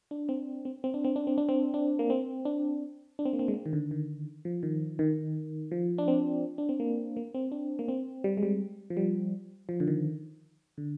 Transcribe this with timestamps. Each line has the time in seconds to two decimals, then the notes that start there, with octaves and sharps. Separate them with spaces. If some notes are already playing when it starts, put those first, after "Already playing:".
0.11 D4
0.29 C4
0.65 C4
0.84 C4
0.94 D4
1.04 C4
1.16 D4
1.27 C4
1.38 D4
1.49 C4
1.74 D4
1.99 A#3
2.10 C4
2.45 D4
3.19 D4
3.25 C4
3.33 A#3
3.39 C4
3.48 G#3
3.54 A#3
3.66 D#3
3.73 D3
3.91 D#3
4.45 F3
4.63 D#3
4.99 D#3
5.71 F3
5.98 D4
6.08 C4
6.58 D4
6.69 C4
6.80 A#3
7.17 A#3
7.34 C4
7.52 D4
7.79 A#3
7.88 C4
8.24 G3
8.37 G#3
8.43 G3
8.90 F3
8.97 G3
9.69 F3
9.80 D3
9.88 D#3
10.78 D3